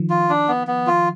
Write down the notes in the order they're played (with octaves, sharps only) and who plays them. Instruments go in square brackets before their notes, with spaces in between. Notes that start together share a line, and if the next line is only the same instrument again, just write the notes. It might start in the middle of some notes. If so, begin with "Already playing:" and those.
Already playing: [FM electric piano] D#3 F3
[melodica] F4
D4
B3
B3
F4